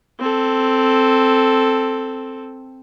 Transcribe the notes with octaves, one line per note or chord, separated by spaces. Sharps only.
C4 A4